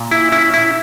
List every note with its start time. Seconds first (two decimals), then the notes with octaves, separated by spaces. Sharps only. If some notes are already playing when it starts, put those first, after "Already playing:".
Already playing: A#2
0.11 E4
0.32 C#4 E4
0.54 E4